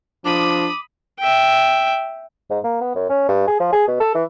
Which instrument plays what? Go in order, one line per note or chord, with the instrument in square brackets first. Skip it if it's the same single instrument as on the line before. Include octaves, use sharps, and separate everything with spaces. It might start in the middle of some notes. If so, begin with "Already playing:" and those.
[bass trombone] F3 [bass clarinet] D4 [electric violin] B5 D#6 [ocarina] D6
[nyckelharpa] E5 G5
[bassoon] G#2
A#3
B3
F#2
C#4
G2
G#4
F3
G#4
B2
A4
E3